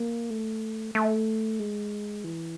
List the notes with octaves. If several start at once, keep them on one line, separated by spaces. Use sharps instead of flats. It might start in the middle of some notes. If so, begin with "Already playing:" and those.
Already playing: A#3
A3
A3
G#3
E3